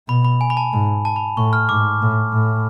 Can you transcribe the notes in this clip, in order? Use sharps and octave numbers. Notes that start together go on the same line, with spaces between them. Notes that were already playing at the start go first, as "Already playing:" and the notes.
B2 B5
B5
G#5
B5
A5
G#2
A5
B5
A2 C#6
F6
G#2 D6
A2
A2